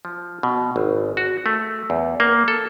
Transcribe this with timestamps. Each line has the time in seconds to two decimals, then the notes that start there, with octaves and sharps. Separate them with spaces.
0.05 F3
0.43 B2
0.76 G#1
1.17 F#4
1.46 A3
1.90 E2
2.20 A#3
2.48 A4